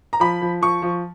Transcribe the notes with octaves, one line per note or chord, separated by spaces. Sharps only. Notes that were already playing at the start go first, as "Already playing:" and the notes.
A#5
F3 B5
F3
F3 C#6
F3